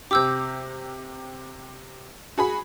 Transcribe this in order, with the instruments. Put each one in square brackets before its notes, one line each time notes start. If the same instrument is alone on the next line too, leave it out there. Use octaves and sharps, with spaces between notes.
[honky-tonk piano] C3 G4 [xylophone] D6 E6 G6
[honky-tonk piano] F#4 G#4 B5